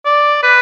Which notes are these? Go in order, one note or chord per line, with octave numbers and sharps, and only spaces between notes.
D5
B4